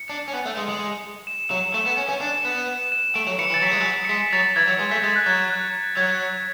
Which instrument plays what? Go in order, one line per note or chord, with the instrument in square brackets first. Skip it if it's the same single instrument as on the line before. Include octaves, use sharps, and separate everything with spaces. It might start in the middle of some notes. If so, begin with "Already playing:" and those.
Already playing: [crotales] C#7
[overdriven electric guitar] D4
C#4
B3
A3
G#3
G#3
[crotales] E7
[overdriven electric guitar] F#3 [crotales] E7
[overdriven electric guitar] A3 [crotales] E7
[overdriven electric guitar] B3
C#4
C#4
D4
B3
[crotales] E7
E7
[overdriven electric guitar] A3 [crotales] D7
[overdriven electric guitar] F#3
[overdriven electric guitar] E3 [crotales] C#7
[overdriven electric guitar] E3
[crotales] A6
[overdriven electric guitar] F#3 [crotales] B6
[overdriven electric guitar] G#3
F#3
[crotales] C#7
[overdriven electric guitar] G#3 [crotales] B6
[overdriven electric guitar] F#3 [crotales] A6
[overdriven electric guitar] E3 [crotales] G#6
[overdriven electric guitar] F#3
G#3
[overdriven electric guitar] A3 [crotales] B6
[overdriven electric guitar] G#3 [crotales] A6
[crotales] F#6
[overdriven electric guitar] F#3 [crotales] G#6
[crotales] F#6
[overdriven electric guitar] F#3 [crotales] G#6